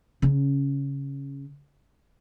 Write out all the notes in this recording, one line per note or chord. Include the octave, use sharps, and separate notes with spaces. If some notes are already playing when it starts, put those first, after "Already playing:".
C#3 C#4